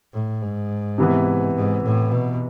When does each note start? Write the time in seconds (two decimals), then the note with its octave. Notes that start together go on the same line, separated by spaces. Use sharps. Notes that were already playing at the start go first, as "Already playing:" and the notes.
0.13 A2
0.42 G#2
0.98 C3 E3 B3
1.55 G#2
1.84 A2
2.11 B2